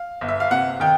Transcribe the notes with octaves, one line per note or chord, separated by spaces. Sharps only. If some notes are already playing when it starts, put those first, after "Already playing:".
Already playing: F5
G1
E5
F5
C3 F#5
D#3 G5